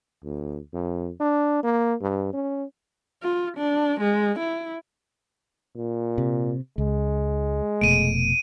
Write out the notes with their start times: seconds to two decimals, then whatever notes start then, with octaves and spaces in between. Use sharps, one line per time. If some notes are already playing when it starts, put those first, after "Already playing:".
0.24 D2
0.74 F2
1.20 D4
1.64 A#3
2.02 G2
2.33 C#4
3.23 F4
3.57 D4
4.00 G#3
4.39 E4
5.76 A#2
6.18 C3
6.78 C#2 G#3
7.81 F1 B2 A3 D7 D#7